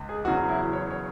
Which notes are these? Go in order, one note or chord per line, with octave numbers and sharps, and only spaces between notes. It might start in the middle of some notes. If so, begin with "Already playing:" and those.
Already playing: C#2
G#4
E2 C#3 F#3 F#4
E4
C#5
C#5